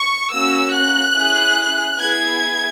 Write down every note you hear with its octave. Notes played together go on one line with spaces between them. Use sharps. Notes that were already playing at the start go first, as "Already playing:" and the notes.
Already playing: C#6
A#3 C#4 F#4 E6
F#6
C#4 E4 G#4
B3 E4 G#4 G#6